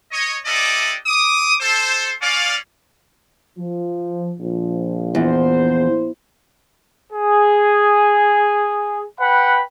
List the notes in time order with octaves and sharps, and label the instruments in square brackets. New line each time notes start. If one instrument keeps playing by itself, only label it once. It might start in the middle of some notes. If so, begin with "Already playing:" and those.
[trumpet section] C#5 D#5
D4 E4 G4 A4 D5 D#5
D6 D#6
A4 C5
C#4 D5 F5
[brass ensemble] F3
A#1 F3
[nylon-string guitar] E2 [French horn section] C5
[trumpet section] G#4
B4 F#5 G5 B5